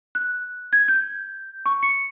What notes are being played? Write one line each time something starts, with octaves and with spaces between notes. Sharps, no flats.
F#6
G#6
G6
C#6
C#7